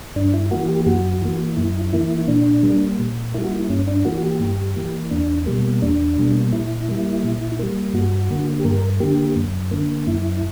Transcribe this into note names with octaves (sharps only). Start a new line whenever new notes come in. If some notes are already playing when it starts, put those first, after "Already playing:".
G2 D4
E4
E3 A#3 F#4
G4
F#2 F#4
E3 A#3
F#2 E4
E3 A#3 E4
A#2 D4
G3 A#3
A#2
G3 A#3 E4
F#4
E4
G2 C#4
D4
E3 A#3 F#4
F#4
G4
G2
E3 A#3
E2 D4
B2 G3 A#3
E2 D4
B2 G3 A#3
A#2 E4
G3 A#3
A#2
G3 A#3
G2 F#4
D3 A#3
G4
G2 A#4
D3 A#3 G4
F#2
D3 A#3
F#2 E4